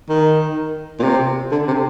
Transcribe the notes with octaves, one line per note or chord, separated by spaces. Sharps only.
D#3
A#2
C3
D3
C3